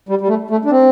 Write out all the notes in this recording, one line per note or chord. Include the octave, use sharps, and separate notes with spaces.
G3
G3
A3
A3
D4
C4